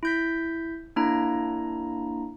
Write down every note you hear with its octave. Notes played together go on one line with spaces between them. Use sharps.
E4 G6 B6
A#3 D4 E4 A#5